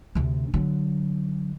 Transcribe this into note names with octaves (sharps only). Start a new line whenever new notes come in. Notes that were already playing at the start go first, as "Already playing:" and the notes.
D2 C3
D3 F#3